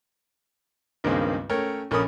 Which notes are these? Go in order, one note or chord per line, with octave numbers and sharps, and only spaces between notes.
C#2 G2 D#3 G#3 A#3 C4
A3 C#4 A#4 C#5 G5
A#1 C#4 A4 A#4 B5 D#6